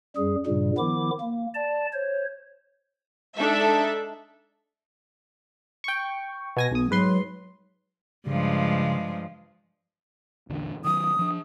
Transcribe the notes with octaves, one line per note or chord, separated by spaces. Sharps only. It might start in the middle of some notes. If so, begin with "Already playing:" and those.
F#2 G3 G#4
G2 A#2 C#3 G3
D#3 F3 B3 E4 D6
A#3
D5 A5
C5 C#5
G#3 D4 D#4 A4 E5
G5 C#6
B2 G#5 A#6
B1 B3 D#6
G#2 F#3 B4 C6
G2 C#3 F3 G#3
A#1 E2 D3
D#3 F#3 D#6
F3 D4